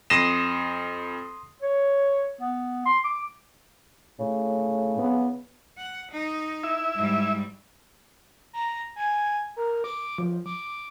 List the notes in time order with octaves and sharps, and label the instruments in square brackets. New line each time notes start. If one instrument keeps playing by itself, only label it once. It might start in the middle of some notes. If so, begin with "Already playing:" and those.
[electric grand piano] F2 A#6 E7 [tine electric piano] C6 D#6 C7
[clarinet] C#5
B3
C6
D6
[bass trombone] A2 [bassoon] C#3
[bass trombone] B3
[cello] F#5
D#4
[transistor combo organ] E4 E5
[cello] G#2 G3
[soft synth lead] A#5
G#5
A#4
D6
F3
D6